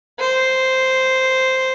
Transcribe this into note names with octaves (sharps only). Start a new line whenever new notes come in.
C5